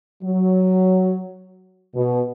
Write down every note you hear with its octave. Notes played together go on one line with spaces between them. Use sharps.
F#3
B2